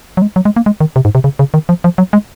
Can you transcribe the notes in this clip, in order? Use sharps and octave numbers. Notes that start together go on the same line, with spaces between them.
F#3
G#3
F#3
G#3
A#3
G#3
D#3
C3
G#2
C3
C#3
C#3
D#3
F3
F3
F#3
G#3